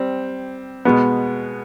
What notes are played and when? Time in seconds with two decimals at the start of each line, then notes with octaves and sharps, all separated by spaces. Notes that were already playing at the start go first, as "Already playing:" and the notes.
Already playing: G3 C4
0.85 B2 G#3 B3